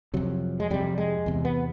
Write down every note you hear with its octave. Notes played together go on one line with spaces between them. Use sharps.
F2 C3 F#3
G#3
F2 C3 G3
G#3
E2 C3
B3